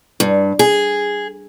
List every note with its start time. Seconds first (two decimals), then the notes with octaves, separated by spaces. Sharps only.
0.20 G2
0.59 G#4